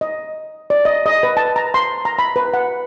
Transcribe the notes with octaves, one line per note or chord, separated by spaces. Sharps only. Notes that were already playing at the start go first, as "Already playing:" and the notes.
D#5
D5
D#5
D#5
B4
A5
A#5
C6
A#5
B5
B4
F#5